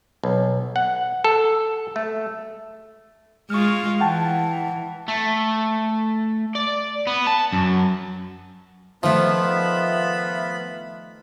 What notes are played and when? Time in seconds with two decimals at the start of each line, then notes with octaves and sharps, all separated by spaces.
0.24 B1
0.76 F#5
1.24 A4
1.96 A3
3.50 G#3 F4 C#6 F6
4.00 E3 F#5 G5 A5
5.08 A3
6.55 D5
7.07 B3
7.27 A5
7.53 F#2
9.03 D#3 F3 A3 B3 F4 E5 B5